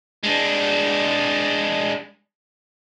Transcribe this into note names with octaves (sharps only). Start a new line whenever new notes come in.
G#3 D4